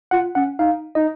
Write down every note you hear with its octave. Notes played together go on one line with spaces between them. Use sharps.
F4 F#5
C#4 F#5
D#4 F5
D#4 D#5